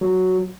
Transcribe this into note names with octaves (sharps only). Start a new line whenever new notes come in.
F#3